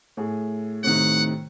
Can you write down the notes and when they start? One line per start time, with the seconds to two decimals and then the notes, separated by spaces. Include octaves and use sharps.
0.17 A2 G#4
0.84 A2 C3 D#3 F#5